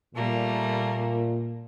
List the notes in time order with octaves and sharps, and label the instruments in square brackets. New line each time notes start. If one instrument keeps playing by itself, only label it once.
[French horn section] A#2 [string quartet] G3 A3 A#3